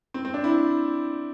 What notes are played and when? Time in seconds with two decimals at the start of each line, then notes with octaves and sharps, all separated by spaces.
0.14 C4
0.25 C4
0.34 D4
0.44 E4